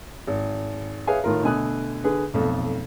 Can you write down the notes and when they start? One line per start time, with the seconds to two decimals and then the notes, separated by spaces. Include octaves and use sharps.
0.27 G#1
1.07 G#4 B4 C#5 E5 F5 G#5
1.24 A2 D#3 F4 A#4
1.43 B2 D3 A3 G#5 D#6 F#6
2.04 D3 G#4 B4
2.34 B1 F2 A3